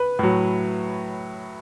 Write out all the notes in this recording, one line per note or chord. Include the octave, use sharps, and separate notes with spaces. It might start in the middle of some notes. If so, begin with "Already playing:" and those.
Already playing: B4
A2 F#3